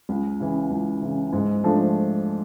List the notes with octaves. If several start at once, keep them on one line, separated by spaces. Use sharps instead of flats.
C#2
C#3 E3
C#2
C#3 E3
G#2
F3 A3 D4